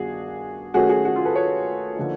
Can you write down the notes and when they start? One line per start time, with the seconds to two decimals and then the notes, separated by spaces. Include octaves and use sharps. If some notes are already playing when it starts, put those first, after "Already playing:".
Already playing: G2 D#3 B3 D4 F#4 G#4
0.74 D#3 F#3 A3 C#4 F#4 G#4
0.89 F#4 G#4
1.05 F#4
1.16 F4
1.25 A4 B4
1.36 B4 C#5
1.97 D3 F3 A#3 D#4